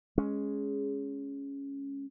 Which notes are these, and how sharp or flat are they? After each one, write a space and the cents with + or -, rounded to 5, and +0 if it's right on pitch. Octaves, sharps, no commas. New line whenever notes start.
G#3 +0 C#4 +0